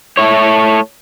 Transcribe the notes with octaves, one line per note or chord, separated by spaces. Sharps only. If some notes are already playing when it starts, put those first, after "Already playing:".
A3 E4 C#5